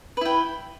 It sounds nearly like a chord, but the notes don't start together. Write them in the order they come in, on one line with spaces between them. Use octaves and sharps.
B4 E4 G5